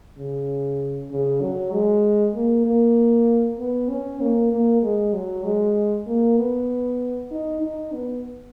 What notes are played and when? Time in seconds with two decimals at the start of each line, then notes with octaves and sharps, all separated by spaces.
0.17 C#3
1.10 C#3
1.41 F#3
1.73 G#3
2.34 A#3
2.66 A#3
3.59 B3
3.90 C#4
4.21 A#3
4.52 A#3
4.82 G#3
5.13 F#3
5.44 G#3
6.07 A#3
6.38 B3
7.31 D#4
7.62 D#4
7.93 B3